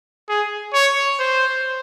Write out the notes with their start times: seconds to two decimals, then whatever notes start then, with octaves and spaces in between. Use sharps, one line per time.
0.29 G#4
0.74 C#5
1.19 C5